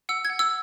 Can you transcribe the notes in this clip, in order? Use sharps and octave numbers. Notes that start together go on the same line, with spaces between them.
F#5 E6
G#6
F#5
E6